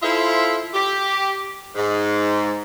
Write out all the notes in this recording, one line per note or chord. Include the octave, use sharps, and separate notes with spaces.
E4 F4 A4 C5 E5
G4
G#2